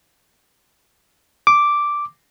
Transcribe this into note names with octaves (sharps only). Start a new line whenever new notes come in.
D6